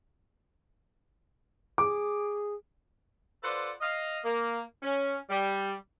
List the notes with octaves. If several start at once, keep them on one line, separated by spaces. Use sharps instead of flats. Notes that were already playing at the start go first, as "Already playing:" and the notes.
G#4 D6
F4 A4 B4 C5 D5 F#5
D#5 F5
A#3
C#4
G3